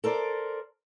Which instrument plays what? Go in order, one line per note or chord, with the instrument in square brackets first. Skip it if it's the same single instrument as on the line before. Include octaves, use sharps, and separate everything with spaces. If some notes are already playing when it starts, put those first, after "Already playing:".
[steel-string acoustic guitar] A4 A#4 C5 D5